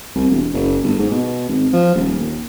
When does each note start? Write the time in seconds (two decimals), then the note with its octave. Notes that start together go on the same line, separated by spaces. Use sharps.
0.15 C2
0.31 E1
0.53 F#1
0.83 G1
0.99 G#2
1.11 B2
1.49 G#1
1.73 F3
1.95 D#1
2.20 D#2